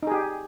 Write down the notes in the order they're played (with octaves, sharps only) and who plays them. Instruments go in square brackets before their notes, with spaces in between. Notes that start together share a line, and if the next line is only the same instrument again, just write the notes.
[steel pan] D#4
G#4
G4